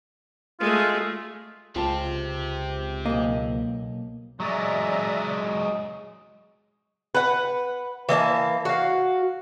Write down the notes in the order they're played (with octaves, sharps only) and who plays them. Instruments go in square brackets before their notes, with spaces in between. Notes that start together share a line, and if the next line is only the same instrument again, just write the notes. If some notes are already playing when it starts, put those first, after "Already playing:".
[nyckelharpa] G#3 A3 [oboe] F4
[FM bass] C#2 [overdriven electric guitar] C4 G4 [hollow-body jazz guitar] F4 A5
[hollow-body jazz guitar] B1 D#5 [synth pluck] A#3
[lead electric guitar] F#3 G#3 [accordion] D5 E5 A#5
[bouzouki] B4 F#5
E3 A#3 D#5 A5
F#4 F5